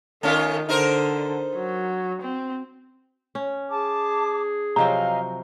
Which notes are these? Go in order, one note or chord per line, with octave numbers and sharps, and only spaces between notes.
D#3 A3 C#4 F4
D3 D#4 A#4 C5
F#3
C4
C#4
G#4 A5 D6
C3 F3 F#3 D#5 F5 G#5 A#5